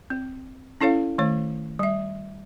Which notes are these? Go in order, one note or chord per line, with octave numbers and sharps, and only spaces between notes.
C4
C#4 E4 A4 C#5 F5
D#3 A3 C#5
G3 E5